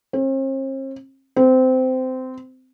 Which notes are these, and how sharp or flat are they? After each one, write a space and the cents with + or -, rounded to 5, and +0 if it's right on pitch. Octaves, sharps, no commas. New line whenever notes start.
C4 +45
C4 -20